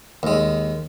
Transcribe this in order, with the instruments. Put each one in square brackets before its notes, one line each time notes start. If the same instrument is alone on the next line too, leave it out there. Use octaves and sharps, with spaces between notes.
[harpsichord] D#2 G#3